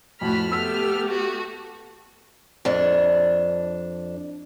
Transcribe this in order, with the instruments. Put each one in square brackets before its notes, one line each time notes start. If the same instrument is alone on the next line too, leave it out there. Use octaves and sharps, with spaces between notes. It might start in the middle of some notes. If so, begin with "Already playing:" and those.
[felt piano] F2 A2 [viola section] F#4 B5 [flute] A5 [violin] F6
[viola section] A3 B3 G4 [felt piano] E6 B6
[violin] F#4
[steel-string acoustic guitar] F2 D4